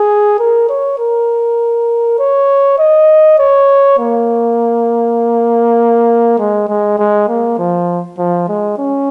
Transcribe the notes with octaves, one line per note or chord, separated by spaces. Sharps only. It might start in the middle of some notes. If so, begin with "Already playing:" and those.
Already playing: G#4
A#4
C#5
A#4
C#5
D#5
C#5
A#3
G#3
G#3
G#3
A#3
F3
F3
G#3
C#4